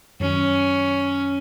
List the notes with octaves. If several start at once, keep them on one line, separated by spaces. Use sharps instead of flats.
F#2 D#3 F#3 C#4